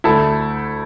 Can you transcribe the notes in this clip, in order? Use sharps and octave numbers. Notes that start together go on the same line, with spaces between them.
D2 D3 A3 E4 A4